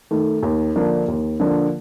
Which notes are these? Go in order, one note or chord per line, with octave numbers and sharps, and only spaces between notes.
D#3 A3
D#2
D3 F3 A#3 D4
D#2
D3 F3 A#3 D4